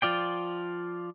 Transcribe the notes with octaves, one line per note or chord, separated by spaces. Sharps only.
F3 F4 D5 G5